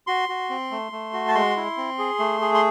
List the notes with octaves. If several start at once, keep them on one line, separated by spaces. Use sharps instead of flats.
F#4 C6
F#4
C4
A3
A3
F#4
A5
G#3 C6
E4
C4
G#4
A3
G#4
C6